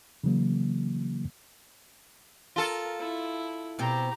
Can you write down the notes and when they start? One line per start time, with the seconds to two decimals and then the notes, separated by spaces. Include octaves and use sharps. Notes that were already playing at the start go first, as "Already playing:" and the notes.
0.24 C#3 E3 F#3 A#3
2.56 F4 A4 A#4
2.99 E4
3.79 B2 C4 G4 A#5